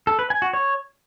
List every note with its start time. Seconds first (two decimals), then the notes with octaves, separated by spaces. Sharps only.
0.07 A4
0.19 B4
0.30 G#5
0.42 F#4
0.53 C#5